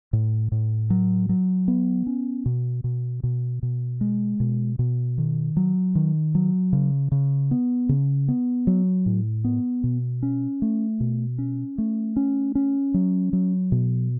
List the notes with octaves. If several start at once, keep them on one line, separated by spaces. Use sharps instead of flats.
A2
A2
F#3
F#3
B3
C#4
B2
B2
B2
B2
G#3
B2
B2
D#3
F#3
D#3
F#3
C#3
C#3
B3
C#3
B3
F#3
A2
B3
B2
C#4
A3
B2
C#4
A3
C#4
C#4
F#3
F#3
B2